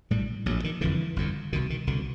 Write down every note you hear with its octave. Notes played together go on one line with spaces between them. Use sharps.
A#1 A2 G3
A#1 A2 F#3
D#3
G1 F2 D3 E3
G1 F2 D3
C2 B2 D#3
D#3
C2 B2 D3